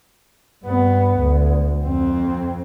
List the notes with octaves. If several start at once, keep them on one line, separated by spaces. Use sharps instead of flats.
G2 B3
D2
F2 C4